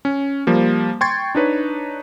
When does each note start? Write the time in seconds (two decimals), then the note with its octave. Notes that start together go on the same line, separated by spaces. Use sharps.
0.05 C#4
0.47 F3 G3 A#3
1.01 G5 C6 C#6 G#6 A6
1.35 D4 D#4 B4 C#5